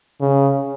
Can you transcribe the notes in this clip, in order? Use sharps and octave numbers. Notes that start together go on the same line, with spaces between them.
C#3